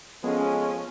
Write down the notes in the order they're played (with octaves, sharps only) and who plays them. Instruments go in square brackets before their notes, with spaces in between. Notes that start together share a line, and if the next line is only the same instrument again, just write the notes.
[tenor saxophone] F3 [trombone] G#3 [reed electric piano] B3 G#4 A4 [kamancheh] C#4